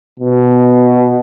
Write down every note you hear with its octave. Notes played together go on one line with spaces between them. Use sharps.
B2